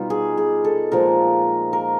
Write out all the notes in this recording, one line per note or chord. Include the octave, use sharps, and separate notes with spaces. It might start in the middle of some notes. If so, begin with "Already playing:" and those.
Already playing: B2 G3 D#4 F4
G#4
G#4
A4
A#2 F3 G#3 A#4
A#4